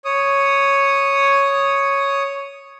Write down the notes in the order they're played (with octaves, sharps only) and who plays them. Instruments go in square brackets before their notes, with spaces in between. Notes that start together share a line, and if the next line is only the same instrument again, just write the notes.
[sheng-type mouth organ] C#5 D#6